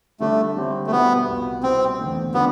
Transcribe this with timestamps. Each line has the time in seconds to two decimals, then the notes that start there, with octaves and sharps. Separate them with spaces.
0.20 D3 G3 A3 D4
0.56 D3 G3 C4 G4
0.87 A3
0.92 B2 G3 B3 C4 E4
1.27 C2 B2 B3 F4
1.63 B2 G3 B3 C4 E4
1.99 E2 D3 A3
2.34 D3 G3 B3 D4 F4